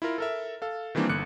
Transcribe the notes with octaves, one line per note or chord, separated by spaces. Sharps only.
E4 F4 A#4
A4 A#4 E5
A4 F5
D#3 E3 G3 A#3 C4 D4
G1 D3 F#6 C#7